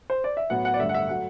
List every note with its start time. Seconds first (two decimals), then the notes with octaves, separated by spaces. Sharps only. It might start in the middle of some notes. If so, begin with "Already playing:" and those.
0.10 C5
0.24 D5
0.37 E5
0.50 A2 F#3 B3 F#5
0.65 F#5
0.74 D5
0.79 G2 D3 A3 E5
0.89 F#5
0.94 E5
1.09 F#3 A3 F#5